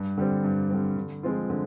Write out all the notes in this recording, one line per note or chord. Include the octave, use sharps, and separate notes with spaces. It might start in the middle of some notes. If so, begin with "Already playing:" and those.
Already playing: G2
D3 G3 C4
G2
D3 G3 C4
D3
F3 G#3 C4 F4
D3